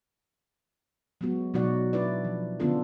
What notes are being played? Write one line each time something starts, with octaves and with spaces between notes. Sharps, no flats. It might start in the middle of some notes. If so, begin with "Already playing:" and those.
F#3 G#3 B3 F#4
B2 F#3 D#4 F#4 D5 F#5
D4 E4 B4 D5
F3
D3 B3 C#4 D4 F4 A4